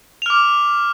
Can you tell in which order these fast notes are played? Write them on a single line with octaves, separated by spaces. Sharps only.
F7 F6 D6